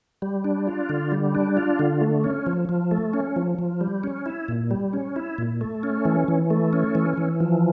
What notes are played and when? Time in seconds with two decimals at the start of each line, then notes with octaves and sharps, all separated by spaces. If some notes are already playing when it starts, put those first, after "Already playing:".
0.22 G3
0.44 D4
0.67 F4
0.89 D3
1.12 G3
1.35 D4
1.57 F4
1.79 D3
2.01 A3
2.24 C#4
2.47 F3
2.69 F3
2.91 A3
3.13 C#4
3.36 F3
3.59 F3
3.81 G3
4.04 C#4
4.26 E4
4.48 A#2
4.71 G3
4.93 C#4
5.16 E4
5.38 A#2
5.61 A3
5.83 C#4
6.05 E3
6.28 E3
6.50 A3
6.73 C#4
6.95 E3
7.18 E3
7.40 F3